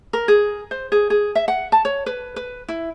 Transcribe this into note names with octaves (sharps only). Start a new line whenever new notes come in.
A#4
G#4
C5
G#4
G#4
E5
F#5
A5
C#5
B4
B4
E4